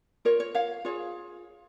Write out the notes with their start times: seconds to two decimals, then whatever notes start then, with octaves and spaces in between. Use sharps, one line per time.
0.25 F4 A#4 C#5
0.40 C#5
0.55 C#5 F5
0.85 F4 G#4 C#5